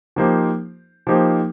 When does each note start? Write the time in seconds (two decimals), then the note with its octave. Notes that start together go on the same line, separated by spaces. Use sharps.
0.16 F3 A#3 D#4 G4 C5
1.07 F3 A#3 D#4 G4 C5